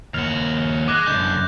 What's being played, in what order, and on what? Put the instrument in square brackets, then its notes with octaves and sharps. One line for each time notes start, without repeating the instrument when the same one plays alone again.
[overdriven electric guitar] D#2 F#4 [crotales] F6 F7
[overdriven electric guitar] G#3 [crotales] D6 F#6 A#6
[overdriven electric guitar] F#2 D3 [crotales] G6